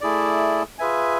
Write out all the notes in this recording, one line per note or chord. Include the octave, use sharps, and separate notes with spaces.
A3 E4 G#4 D5
F4 G#4 B4 E5 G#5